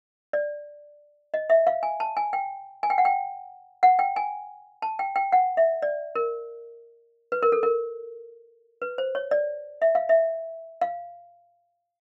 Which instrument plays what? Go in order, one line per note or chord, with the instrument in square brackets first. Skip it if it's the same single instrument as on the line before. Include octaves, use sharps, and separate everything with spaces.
[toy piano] D5
D#5
E5
F5
G#5
A5
G#5
G5
G#5
G5
F#5
G5
F#5
G5
G#5
A5
G5
G5
F#5
E5
D5
A#4
B4
A#4
A4
A#4
B4
C5
C#5
D5
E5
F5
E5
F5